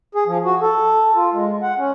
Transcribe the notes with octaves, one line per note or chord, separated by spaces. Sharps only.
G#4
F3
F#4
A4
F4
G#3
F#5
C#4